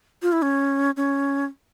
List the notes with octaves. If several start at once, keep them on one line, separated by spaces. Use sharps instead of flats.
F4
E4
C#4
C#4